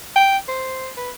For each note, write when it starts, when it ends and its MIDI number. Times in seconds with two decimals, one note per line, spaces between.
0.16 0.37 79
0.48 0.89 72
0.97 1.10 71